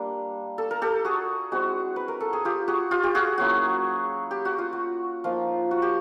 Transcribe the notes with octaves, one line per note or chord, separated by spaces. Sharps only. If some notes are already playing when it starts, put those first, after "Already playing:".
Already playing: G3 A#3 D4
A4
A#4
G4 A4
F#4 G#4
G#3 C4 E4 F#4
B4
A#4
A4
G#4
F4 G4
F#4 G#4
F4 G4
G4
F#4 G#4
F#3 A#3 C#4 E4 F#4
G4
F#4
F4
F#4
F3 A#3 D#4 F4
F#4
G4